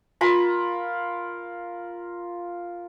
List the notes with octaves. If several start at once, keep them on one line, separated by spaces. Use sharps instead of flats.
F4 A#4 B5